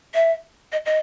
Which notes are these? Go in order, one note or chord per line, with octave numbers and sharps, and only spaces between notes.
E5
D#5
D#5